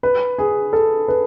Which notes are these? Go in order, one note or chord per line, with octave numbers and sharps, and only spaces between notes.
B4
G#4
A4
B4